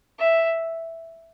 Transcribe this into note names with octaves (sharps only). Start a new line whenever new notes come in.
E5